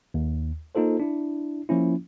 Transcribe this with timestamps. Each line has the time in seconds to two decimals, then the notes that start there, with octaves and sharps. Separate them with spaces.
0.14 D#2
0.75 A#3 D#4 F4 A4 C5
1.00 D4 E4
1.69 F3 A#3 C#4 E4